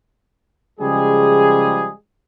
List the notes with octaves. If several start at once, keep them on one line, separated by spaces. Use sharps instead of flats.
C#3 F3 G3 G#3 G#4